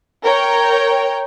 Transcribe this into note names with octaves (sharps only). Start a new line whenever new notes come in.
A#4 C#5 G5